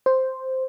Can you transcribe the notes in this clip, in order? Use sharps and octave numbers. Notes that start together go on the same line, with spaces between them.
C5